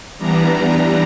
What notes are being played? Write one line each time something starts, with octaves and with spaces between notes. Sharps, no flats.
E3 G3 B3 D4 A#5